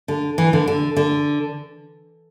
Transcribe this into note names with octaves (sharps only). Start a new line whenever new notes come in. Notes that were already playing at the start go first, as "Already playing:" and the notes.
D3
E3
D3
D3
D3